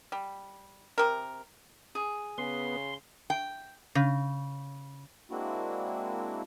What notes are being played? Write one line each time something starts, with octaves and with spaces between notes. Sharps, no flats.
G3
C3 A#4
G#4
C#3 B3 C6
G5
C#3
G#3 A#3 C4 D4 E4 F#4